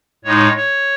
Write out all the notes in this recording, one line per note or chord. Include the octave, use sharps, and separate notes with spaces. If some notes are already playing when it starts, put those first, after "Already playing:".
A2 G#3 D#4 C#5
C#5